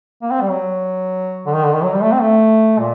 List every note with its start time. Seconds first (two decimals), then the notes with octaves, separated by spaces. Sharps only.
0.22 A#3
0.31 C4
0.41 G3
0.50 F#3
1.46 D3
1.55 D#3
1.65 D3
1.74 D#3
1.83 F#3
1.93 G3
2.02 A3
2.12 C4
2.21 A3
2.79 A#2